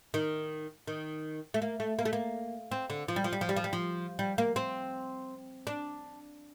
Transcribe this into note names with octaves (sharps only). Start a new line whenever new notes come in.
D#3
D#3
A3
A#3
A3
A#3
A3
A#3
C4
D3
F3
G3
F3
G3
F3
G3
F3
G3
F3
G3
A#3
C4
D4